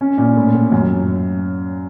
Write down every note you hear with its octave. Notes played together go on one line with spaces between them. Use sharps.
C#4
A#2
A2
A2
F#2